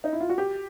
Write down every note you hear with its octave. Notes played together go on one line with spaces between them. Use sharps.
D#4
E4
F4
F#4
G4